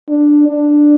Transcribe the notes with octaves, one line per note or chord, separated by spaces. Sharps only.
D4
D4